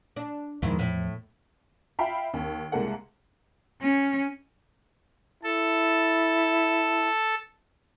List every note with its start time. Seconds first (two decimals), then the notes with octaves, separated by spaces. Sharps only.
0.16 D4
0.62 E2 G#2 D#3 F3 E4
0.79 A2
1.99 F4 E5 F5 G5 B5
2.34 D#2
2.72 C2 G#3 A#3 A4 F#5
3.82 C#4
5.44 E4 A4